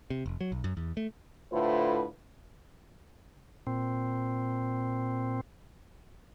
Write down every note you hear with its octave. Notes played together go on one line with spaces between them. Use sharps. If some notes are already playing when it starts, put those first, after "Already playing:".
C3
F1
F#3
B1
F#2
E2
A3
A2 D3 E4 F4 B4 C5
A#2 C4